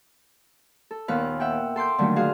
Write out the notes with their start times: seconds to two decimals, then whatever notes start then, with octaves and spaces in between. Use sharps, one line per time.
0.91 A4
1.08 D#2 A#2 B3 B4 F6
1.40 E5 F#5 G5
1.76 A4 C6 D6 G6
1.98 A#2 D3 D#3 F#3 G3 A3
2.16 F4 F#4 G#4 F5